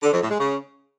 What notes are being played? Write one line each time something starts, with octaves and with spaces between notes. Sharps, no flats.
D3
F2
A2
G#3
C#3